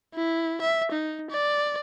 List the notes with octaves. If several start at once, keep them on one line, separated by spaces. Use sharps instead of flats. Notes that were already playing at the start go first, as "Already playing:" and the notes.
E4
E5
D#4
D5